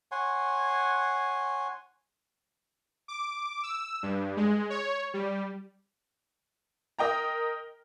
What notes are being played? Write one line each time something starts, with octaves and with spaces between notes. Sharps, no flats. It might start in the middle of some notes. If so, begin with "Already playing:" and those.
C#5 F#5 G#5 C6
D6
E6
G2
G#3
C#5
G3
A#4 D#5 G5 A#5